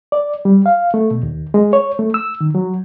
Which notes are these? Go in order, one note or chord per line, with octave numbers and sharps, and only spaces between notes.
D5
G3
F5
A3
B2
D#2
G#3
C#5
A3
E6
D#3
F#3